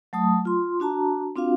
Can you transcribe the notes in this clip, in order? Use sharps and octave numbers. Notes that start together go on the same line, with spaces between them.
F#3 A3 A5 D#6
F4 C6
D4 F#4 A5 A#5
C4 D4 F4 F#4 F5